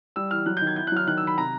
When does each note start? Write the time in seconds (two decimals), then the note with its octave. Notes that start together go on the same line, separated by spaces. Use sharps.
0.16 G3 E6
0.31 E3 F6
0.46 F#3 F#6
0.57 G6
0.61 D#3
0.67 G#6
0.76 E4 G6
0.87 F#6
0.92 F#3 F6
1.07 D#3 F#6
1.17 E6
1.22 D#3 B5
1.37 C3 A#5